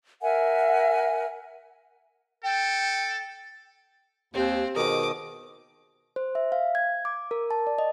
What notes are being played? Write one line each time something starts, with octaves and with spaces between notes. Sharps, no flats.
A#4 E5 F#5 G#5
A4 G5
D#2 C4 G4 C5
B2 D#3 G#4 A#4 C5 D6 D#6
C5
E5
F5
G#6
D6
A#4
A5
D5
D#5